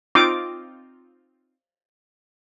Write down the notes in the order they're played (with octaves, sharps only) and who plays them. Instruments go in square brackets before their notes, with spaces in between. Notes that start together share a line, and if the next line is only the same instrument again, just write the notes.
[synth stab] C4 D#4 F4 [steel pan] D6